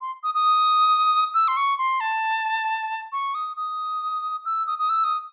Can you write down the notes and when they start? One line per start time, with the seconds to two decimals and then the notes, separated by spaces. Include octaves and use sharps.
0.01 C6
0.23 D#6
0.34 D#6
1.34 E6
1.48 C6
1.57 C#6
1.78 C6
2.00 A5
3.12 C#6
3.35 D#6
3.57 D#6
4.45 E6
4.67 D#6
4.79 D#6
4.90 E6
5.04 D#6